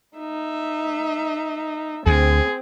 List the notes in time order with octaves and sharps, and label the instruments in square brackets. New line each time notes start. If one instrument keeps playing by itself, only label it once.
[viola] D#4 E5
[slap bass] D2 [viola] C4 [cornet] G#4